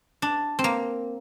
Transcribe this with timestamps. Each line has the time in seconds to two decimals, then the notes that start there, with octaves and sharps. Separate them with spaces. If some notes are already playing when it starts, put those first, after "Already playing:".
0.22 D4
0.59 C4
0.64 A#3